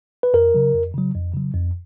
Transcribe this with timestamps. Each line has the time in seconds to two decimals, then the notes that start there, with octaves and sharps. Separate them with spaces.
0.23 B4
0.34 F2 A#4
0.54 C#3 F#3
0.74 F2
0.94 C#3 F#3
1.15 F2
1.34 C#3 F#3
1.54 F2